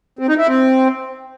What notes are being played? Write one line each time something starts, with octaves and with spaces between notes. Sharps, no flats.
C4
D#4
E4
C4